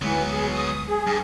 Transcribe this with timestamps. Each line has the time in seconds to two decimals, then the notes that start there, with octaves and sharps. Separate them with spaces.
0.02 D2 E3 F#3 G#3 B3
0.32 G#4
0.54 D#6
0.87 G#4
1.07 G2